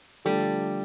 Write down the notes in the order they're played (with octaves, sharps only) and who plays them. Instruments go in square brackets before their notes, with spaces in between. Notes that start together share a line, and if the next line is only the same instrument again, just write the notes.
[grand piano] D3 F3 A3 D4 A4 [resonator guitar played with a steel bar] G3